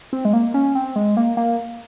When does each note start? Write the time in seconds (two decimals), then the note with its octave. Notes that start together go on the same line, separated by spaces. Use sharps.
0.13 C4
0.25 G#3
0.33 A#3
0.54 C#4
0.75 C4
0.96 G#3
1.17 A#3
1.37 A#3